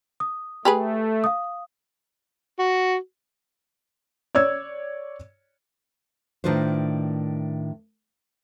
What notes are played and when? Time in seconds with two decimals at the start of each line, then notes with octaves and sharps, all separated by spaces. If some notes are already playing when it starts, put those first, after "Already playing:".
0.20 D#6
0.65 A3 G4 G#4 B4
1.24 F5 D#6
2.59 F#4
4.35 C#5 D5 E6 G#6
6.44 A2 D#3 D4 F4 B4 C5